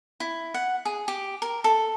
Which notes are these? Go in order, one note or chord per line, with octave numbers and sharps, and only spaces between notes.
E4
F#5
G#4
G4
A#4
A4